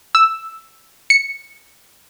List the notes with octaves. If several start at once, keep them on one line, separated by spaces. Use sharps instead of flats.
E6
C#7